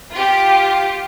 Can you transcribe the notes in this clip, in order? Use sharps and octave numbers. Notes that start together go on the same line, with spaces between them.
F4 G4